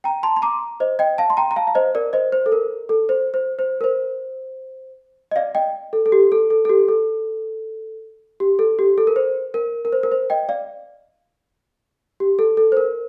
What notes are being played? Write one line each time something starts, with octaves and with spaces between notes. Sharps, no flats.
G5 A#5
A5 C6
C6
A#5 D6
C5 D#5
D#5 G5
F5 A5
C6
G5 A#5
A#5
F5 A5
F5
C5 D#5
A#4 D5
C5 D#5
C5
A4
A#4
A4
C5
C5
C5
A#4
C5
D#5
D5 F5
D#5 G5
A4
A4
G4
A4
A4
A4
G4
A4
G4
A4
G4
A4
A#4
C5
A#4
A#4
C5
A#4
C5
D#5 G5
D5 F5
G4
A4
A4
C5
A#4